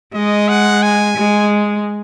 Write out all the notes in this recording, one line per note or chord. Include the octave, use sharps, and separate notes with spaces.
G#3 D#5
F#5
G#5
G#3